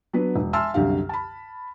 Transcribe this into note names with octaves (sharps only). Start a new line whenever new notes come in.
F#3 B3 D4 B4
E1
E5 G#5 A5 C6 E6 F6
C2 F#2 D3 G4 F5
A5 B5